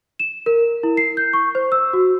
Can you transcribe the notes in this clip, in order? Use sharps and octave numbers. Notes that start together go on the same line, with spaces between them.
E7
A#4
E4
C7
G6
C#6
C5
E6
F#4